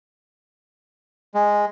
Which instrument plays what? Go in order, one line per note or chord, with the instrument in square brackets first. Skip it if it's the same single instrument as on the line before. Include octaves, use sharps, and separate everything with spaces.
[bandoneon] G#3